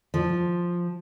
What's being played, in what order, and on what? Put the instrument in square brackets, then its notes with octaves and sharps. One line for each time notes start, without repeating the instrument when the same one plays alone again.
[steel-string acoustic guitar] F3